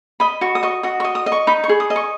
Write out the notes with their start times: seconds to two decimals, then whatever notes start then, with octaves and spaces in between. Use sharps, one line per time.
0.20 D#5 B5
0.41 F#4 C#6
0.55 D#6
0.63 D#5 C#6
0.83 F#4 D#6
1.00 C#6
1.04 D#5
1.15 D#6
1.26 D#5
1.32 C#6
1.47 D#4 B5
1.64 C#6
1.69 G#4
1.80 D#6
1.90 D#5
1.96 C#6